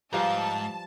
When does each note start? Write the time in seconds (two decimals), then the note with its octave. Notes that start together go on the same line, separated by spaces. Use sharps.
0.13 G#2 F3 G3 B4 C5 F5 A5